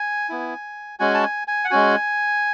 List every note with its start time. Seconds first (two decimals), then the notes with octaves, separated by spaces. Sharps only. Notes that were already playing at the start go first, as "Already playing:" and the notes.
Already playing: G#5
0.29 B3 E4
0.99 G#3 C#4 F#4 G#5
1.14 A5
1.23 G#5
1.48 G#5
1.65 F#5
1.71 G#3 C#4 F#4 G#5